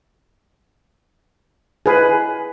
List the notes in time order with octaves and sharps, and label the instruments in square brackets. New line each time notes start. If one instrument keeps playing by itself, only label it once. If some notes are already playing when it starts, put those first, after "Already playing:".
[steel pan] G#4 B4